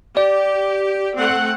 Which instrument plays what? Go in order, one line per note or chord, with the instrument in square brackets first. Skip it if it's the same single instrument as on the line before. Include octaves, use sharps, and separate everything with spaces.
[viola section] G4 [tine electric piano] D5
[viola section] A3 C4 F#5